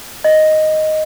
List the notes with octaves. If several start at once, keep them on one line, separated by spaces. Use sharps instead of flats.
D#5